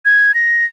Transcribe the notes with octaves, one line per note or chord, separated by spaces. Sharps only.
G#6
A#6